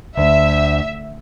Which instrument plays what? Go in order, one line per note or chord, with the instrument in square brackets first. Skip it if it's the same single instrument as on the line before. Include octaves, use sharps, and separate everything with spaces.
[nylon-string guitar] D2 [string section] E5